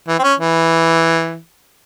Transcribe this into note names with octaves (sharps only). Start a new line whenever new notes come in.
E3
C4
C#4
E3